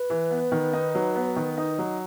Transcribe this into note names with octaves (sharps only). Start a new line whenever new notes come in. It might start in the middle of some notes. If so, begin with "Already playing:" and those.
Already playing: B4
E3
B3
D#3
D#4
F#3
B3
D#3
D#4
F#3